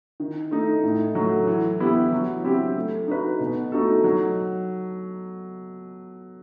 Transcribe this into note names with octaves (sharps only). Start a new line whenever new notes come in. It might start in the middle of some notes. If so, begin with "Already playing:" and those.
D#3
A3 D#4
A2
F#3 A3
E3
B3 E4 G4
F#3
C4 E4 G4
A3
D#4 F#4 B4
B2
A3 D#4 F#4 A4
F#3